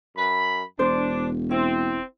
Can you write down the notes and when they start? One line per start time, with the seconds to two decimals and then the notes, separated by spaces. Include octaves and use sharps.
0.17 F#2 B5
0.79 E1 D4 C5
1.51 C4 E4